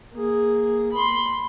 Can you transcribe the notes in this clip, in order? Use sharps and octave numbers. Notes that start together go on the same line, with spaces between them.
A#3 G#4
B5 C6